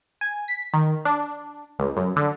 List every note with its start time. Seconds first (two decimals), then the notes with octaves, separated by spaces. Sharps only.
0.21 G#5
0.48 B6
0.74 D#3
1.05 D4
1.79 C#2
1.97 F#2
2.16 D3